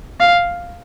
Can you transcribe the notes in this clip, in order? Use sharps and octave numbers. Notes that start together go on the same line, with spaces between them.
F5